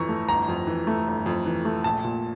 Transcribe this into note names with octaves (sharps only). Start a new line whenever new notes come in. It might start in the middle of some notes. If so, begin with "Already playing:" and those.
Already playing: G1 F2 E3 A#5 C#6
A3
G1 A#5
F2
E3
A3
G1
F2
E3
A3
A#1 A5
A#2